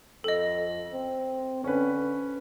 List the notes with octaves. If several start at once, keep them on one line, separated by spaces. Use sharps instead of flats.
F2 A4 D#5
C4
D3 C#4 B4